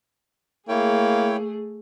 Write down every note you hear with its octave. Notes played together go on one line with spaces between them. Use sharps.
A3 A#3 E4 G#4 C#5 G5